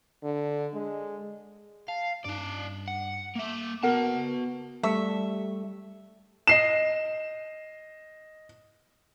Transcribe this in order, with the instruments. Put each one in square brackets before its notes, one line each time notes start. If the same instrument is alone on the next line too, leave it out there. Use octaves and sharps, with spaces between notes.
[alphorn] D3
G#3
[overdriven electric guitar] F5 [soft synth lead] A5
[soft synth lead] G2 [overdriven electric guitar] D#4 D5
[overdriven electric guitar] F#5
[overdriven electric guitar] A#3 E5 [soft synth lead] D6
[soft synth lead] B3 [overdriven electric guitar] F#4 A5 [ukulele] A#4 F#5
[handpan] G3 [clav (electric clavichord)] A3 [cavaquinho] E5
[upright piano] D#5 C7 E7